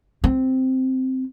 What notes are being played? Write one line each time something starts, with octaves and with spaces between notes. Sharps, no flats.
C4